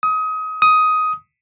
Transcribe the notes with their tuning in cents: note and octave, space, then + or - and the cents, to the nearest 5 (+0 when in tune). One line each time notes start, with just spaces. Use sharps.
D#6 +25
D#6 +10